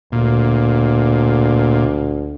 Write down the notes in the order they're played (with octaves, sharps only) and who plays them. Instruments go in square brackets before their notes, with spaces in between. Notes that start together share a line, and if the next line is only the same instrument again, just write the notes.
[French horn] D2 [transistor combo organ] A#2